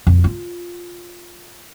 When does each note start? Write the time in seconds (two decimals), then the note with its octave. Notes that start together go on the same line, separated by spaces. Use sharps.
0.07 F2
0.24 F4